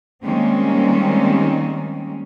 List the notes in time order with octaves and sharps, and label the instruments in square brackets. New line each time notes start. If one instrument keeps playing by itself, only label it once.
[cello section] D#3 G3 G#3 A#3 C4 C#4